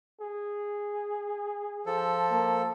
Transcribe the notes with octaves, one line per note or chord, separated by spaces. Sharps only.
G#4
F3 A4
A#3